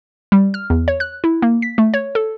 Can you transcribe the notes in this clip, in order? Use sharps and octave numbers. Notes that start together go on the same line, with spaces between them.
G3
F6
E2
C#5
F#6
E4
A#3
B6
A3
C#5
A4